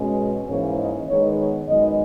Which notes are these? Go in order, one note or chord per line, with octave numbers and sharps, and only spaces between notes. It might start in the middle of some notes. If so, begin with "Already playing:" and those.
Already playing: B2 G#3 C#4
G#2 E3 A#3 C#4 C#5
D#5
D#3 G#3 B3 D#4 C#5
C#5
F#2 D#3 G#3 B3 D#4 D#5